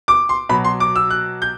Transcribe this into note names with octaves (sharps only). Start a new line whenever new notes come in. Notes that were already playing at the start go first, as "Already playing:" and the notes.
D6
C6
B2 F#3 B5
C6
D6
E6
F#6
G6